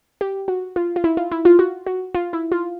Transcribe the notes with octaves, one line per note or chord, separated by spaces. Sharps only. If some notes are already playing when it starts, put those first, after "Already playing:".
G4
F#4
F4
F4
E4
F4
E4
F4
F#4
F#4
F4
E4
F4